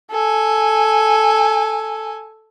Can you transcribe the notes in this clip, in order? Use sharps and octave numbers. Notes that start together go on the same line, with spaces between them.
A4 G#5